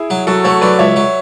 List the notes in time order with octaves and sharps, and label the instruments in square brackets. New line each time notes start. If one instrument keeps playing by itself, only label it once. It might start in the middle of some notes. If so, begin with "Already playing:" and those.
Already playing: [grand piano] E4 G#4
[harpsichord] F#3
[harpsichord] F#3 [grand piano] F#4 A4
[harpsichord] A3 [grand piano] A4 C#5
[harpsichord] F#3 [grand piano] B4 D5
[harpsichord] C#2 [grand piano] C#5 E5
[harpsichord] F#3